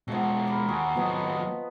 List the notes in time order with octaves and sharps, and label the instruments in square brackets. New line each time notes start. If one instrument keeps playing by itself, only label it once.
[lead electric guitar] B2 G#3 [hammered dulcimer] F3 F#3
[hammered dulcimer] A#4 B5 D6
[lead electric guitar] D#2 [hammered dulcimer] F#4 G#4
[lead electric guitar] D#2 F#3 [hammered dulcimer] F3 B3 D#5